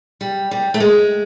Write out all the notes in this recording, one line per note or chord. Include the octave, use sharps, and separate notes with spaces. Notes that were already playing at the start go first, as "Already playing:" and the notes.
G3
G3
A3
G#3